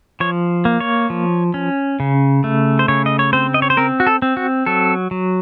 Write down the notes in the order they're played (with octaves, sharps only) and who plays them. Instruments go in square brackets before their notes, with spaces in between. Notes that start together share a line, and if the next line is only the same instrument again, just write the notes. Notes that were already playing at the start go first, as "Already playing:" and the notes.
[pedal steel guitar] F3 C#5
A#3
C#5
F3
C#4
C#3
A3
C5
C#3 C#5
D#5
C#5
C4 C5
D#5
C#5
C5
C4 A#4
F#4
A4
C4
F#4
F#3 A4
F#3